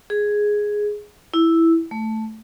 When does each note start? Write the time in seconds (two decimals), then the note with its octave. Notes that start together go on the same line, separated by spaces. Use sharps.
0.10 G#4
1.34 E4
1.91 A3